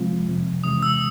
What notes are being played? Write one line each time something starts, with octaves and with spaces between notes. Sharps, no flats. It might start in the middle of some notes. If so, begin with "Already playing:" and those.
Already playing: C3 F3 G#3 C4 F4
F2 C3 F3
E2 C3 E3 G#3 D#6
E6